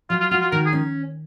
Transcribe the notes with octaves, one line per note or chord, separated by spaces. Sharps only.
F#3 F4
F4
F4 F#4
F4
D#3 A#4
G#4
C#4